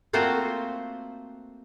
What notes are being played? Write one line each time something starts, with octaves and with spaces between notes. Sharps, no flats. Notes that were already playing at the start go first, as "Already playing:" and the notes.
A3 A#3 C4 F4 F#4 C5